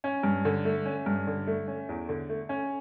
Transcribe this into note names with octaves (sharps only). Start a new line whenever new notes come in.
C#4
G2
D3
A3
C#4
G2
D3
A3
C#4
E2
D3
A3
C#4